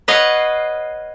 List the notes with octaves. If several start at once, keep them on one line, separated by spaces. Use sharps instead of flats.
B4 C#5 D#5 F5 F#5